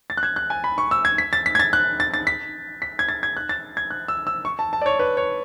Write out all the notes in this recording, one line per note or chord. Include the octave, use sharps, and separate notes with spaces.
A6
F#6
G#6
F#6
G#5
B5
C#6
E6
G#6
B6
A6
B6
G#6
A6
F#6
A6
A6
B6
B6
G#6
A6
G#6
F#6
A6
G#6
F#6
E6
E6
C#6
A5
A5
D5
C#5
B4
C#5